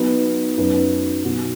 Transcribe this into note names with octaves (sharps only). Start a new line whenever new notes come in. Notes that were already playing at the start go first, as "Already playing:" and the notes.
Already playing: F#3 B3 D#4 B4
F#2 F#3 D#4 B4
B2 F#3 D#4 F#4